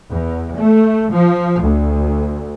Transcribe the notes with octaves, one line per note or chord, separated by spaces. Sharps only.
E2
A3
F3
D2